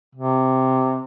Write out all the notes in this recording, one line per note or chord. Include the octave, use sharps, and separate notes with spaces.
C3